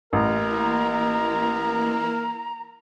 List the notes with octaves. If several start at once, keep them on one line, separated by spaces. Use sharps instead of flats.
A1 E3 A#3 E4 A#4 A#5